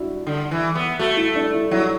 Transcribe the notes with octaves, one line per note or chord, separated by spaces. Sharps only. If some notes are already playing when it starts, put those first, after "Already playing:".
Already playing: D4 E4 F#4
D3
E3
B3
A3 F#4
E4
D4
E4
F#3 E4